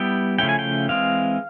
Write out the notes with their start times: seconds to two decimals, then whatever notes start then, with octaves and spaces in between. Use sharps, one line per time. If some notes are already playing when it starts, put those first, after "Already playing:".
Already playing: G3 B3 E4 G5
0.38 C#3 F3 A3 C#4 E4 G5
0.49 G#5
0.59 G5
0.89 E3 G#3 C4 F5